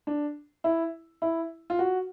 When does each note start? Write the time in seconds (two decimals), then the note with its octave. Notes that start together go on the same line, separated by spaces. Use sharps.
0.07 D4
0.64 E4
1.22 E4
1.70 F4
1.79 F#4